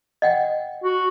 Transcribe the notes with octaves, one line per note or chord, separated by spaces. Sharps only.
D#5 F#5 G5
F#4